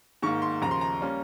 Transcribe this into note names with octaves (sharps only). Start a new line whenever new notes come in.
G#2 D#3 A#3 C#6
C6
D#2 C#3 F3 A#5
C6
A#5
G3 A#3 C#4